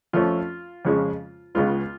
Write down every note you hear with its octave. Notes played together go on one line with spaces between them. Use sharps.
F2 F3 A3 C#4 F4
F2 C#3 G#3 C#4
C#2 C#3 G#3 B3 F4